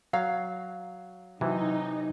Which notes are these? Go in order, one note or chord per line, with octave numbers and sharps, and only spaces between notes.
F#3 F5
C3 E3 F#3 D#4